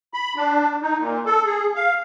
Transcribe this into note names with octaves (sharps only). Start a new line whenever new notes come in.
B5
D4
D#4
A#2
A4
G#4
F5